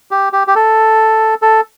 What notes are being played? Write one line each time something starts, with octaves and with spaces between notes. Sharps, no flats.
G4
G4
G4
A4
A4